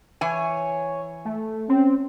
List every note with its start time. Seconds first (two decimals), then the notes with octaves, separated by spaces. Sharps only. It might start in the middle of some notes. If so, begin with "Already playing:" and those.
0.21 E3 C#5 G#5
1.25 A3
1.69 C4 C#4